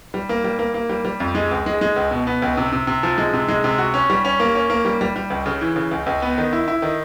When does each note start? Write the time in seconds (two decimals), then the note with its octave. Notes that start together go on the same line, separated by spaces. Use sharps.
0.14 G3
0.29 A#3
0.44 G3
0.59 A#3
0.74 A#3
0.89 G3
1.04 G3
1.20 F2
1.35 G#3
1.51 C#2
1.66 G#3
1.81 G#3
1.96 C#2
2.11 B2
2.27 B3
2.42 C#2
2.57 C3
2.72 C3
2.87 C3
3.03 F3
3.18 G#3
3.33 C3
3.49 G#3
3.64 C3
3.78 F#4
3.94 C#4
4.10 G3
4.25 C#4
4.40 A#3
4.55 C#4
4.70 A#3
4.85 G3
5.01 G3
5.16 G3
5.30 C#2
5.46 C#3
5.61 E3
5.76 C#3
5.91 C#2
6.06 C#2
6.22 B3
6.38 D#3
6.53 E4
6.68 E4
6.82 D#3